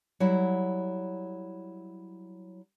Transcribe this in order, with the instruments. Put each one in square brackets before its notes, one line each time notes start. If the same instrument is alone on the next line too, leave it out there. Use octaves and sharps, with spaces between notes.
[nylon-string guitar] F#3 G3 E4 E5 F#5